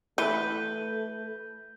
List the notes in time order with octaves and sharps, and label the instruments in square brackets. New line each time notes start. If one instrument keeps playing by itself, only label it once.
[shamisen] E3 [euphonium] A3 [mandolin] B4 [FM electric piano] G6